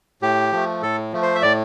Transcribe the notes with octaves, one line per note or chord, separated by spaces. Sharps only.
A2 G4
F3 A3
A2 A4
F3 A3
C5
E5
A2 D5